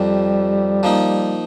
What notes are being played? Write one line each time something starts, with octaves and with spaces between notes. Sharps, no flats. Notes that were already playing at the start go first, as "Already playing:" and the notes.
Already playing: F2 C3 F3 G3
F3 A#3 D#4